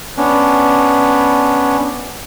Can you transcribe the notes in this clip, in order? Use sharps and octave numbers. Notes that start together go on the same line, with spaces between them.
B3 C#4 D4